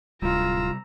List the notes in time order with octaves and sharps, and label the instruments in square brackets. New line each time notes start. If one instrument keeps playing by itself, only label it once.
[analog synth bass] D1 [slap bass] C3 G3 [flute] F4 [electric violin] A#5 E6